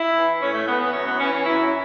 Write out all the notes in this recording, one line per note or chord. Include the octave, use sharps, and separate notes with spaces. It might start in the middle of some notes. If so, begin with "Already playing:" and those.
Already playing: E4
E3
A2 C#4
A3
E3 B3
B3
F#2 C#4
B3
E3 C#4
C#4
F#2 E4